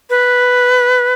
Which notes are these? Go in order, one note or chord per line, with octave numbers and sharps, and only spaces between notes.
B4